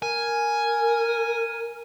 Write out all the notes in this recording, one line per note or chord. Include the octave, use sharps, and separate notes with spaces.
A#4 G#5